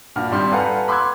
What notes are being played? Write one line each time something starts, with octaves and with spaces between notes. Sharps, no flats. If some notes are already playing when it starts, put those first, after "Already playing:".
G2 A#2 D4 F#4 F6
G#1 G3 G4 C6 F6
A4 B4 F5 F#5 G#5 A#5
B5 C6 D6 E6 F#6 G#6